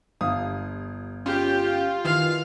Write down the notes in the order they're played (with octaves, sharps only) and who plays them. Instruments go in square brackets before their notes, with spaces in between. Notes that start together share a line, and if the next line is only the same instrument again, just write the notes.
[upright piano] G1 F5 D#6
[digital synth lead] C#4 [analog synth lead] F4 [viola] G4
[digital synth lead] D#3 [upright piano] E3 [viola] F5